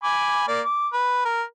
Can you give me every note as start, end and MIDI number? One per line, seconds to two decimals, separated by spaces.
0.04 0.45 80
0.04 0.45 83
0.04 0.45 86
0.48 0.61 58
0.48 0.61 74
0.65 0.88 86
0.93 1.23 71
1.25 1.42 70